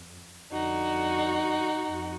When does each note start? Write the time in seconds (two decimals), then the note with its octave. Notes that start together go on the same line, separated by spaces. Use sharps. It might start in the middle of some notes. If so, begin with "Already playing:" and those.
Already playing: F2
0.51 F2 D3 D#4 F#4
1.88 F2